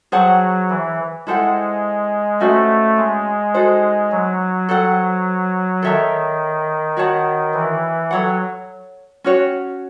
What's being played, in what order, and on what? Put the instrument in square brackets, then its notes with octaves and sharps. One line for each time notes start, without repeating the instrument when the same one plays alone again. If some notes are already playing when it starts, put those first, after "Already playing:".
[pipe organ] F#3 [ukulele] G#4 C5 F#5 A5
[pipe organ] E3
[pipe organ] G#3 [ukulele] E4 A4 C5 F#5
[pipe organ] A3 [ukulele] C#4 F#4 C5 D#5
[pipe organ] G#3
[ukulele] D#4 F#4 A4 C5
[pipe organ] F#3
[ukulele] A4 C5 F#5
[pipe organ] D#3 [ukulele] A4 C#5 E5 A5
[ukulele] F#4 C#5 F#5 A5
[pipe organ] E3
[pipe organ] F#3 [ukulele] A4 C#5 F#5
[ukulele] C#4 F#4 C#5